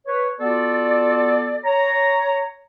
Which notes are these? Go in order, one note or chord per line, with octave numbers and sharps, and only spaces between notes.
B4 C#5
B3 F4 F#4 A4 D5
C#5 A#5